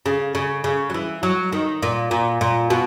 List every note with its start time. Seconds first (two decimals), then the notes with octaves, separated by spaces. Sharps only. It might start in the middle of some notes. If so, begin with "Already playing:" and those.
0.06 C#3
0.35 C#3
0.64 C#3
0.90 F#3
0.94 E3
1.23 F#3
1.52 D#3
1.83 A#2
2.11 A#2
2.41 A#2
2.70 B2